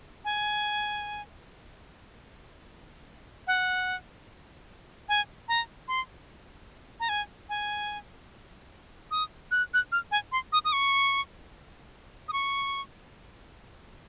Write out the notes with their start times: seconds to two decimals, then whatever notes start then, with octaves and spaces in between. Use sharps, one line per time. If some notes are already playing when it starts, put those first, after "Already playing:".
0.25 G#5
3.47 F#5
5.09 G#5
5.48 A#5
5.88 C6
7.00 A#5
7.09 G#5
7.49 G#5
9.11 D#6
9.51 F#6
9.74 F#6
9.92 F6
10.11 G#5
10.32 C6
10.53 D#6
10.65 D#6
10.73 C#6
12.28 D#6
12.33 C#6